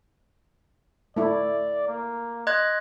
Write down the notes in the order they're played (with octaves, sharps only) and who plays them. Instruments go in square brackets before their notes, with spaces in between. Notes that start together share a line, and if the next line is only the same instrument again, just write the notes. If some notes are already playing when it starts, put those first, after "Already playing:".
[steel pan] A3 E4 [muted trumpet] D5
[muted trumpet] A#3
[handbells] D#5 F#6 G#6 [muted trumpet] C6